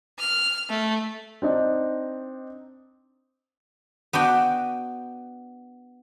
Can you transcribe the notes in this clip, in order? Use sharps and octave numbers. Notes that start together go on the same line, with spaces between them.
F6
A3
C4 D4 D#4
B3 D4 F#4 G5